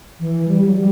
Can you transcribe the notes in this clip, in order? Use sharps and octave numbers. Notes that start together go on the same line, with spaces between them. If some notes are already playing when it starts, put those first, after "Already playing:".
E3
G3
F#3
G3